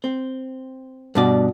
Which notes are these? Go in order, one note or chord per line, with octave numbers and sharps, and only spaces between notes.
C4
G2 B2 D5